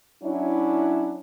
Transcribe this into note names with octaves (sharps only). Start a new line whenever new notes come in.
F#3 C#4 D4 E4